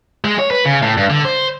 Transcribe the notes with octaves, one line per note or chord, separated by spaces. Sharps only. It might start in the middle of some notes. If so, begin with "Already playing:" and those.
G#3
C#5
B4
C#3
A2
G2
D3
C5